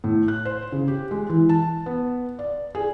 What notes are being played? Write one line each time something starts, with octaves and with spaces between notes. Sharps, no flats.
A2
F#6
C5
C#3
G4
G#3
E3
A5
B3
D5
G#4